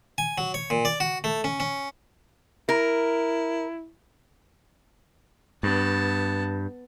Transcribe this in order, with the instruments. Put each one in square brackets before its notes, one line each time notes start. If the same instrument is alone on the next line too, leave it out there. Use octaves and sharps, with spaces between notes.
[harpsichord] G#5
F#3
C#5
A#2
D5
F#4
A3
C#4
C#4
[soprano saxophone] E4 [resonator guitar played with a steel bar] A#4
[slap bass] G2 [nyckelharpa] B3 A5